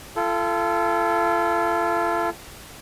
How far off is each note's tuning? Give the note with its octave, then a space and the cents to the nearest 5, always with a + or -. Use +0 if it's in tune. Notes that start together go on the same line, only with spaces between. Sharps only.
F4 -35 A4 +0 G5 -5